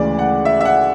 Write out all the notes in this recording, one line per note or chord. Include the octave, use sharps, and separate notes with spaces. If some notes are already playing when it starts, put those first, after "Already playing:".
Already playing: D2 C#3 E3 G#3 D5
F#5
E5
E5
F#5